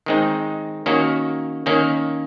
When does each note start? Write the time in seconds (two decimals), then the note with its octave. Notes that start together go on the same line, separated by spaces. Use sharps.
0.06 D#3 G#3 C4 D#4
0.86 D#3 A#3 C#4 F#4
1.66 D#3 A#3 C#4